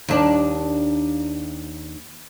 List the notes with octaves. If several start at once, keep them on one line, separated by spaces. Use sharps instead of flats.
D#2 D4